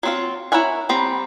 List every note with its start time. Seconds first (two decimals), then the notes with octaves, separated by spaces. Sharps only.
0.03 F#3 C4 F4
0.52 E4 A#4 C#5 F#5 G#5
0.89 G3 C4 A#5 B5